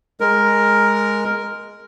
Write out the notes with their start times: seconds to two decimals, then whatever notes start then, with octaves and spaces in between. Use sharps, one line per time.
0.21 G#3 A#4